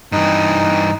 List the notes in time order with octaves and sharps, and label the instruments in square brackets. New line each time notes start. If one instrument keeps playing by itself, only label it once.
[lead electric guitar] G2 E3 [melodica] D#4